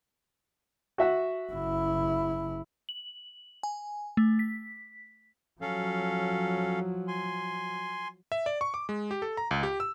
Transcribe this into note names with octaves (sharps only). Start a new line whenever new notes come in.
F#4 E5 F#5
F#1 E4
F#7
G#5
A3
B6
F3 F#3 C#4 A4 F5
G#5 C6
E5
D5
C#6
D6
G#3
G4
A4
A#5
C#2
G4
E6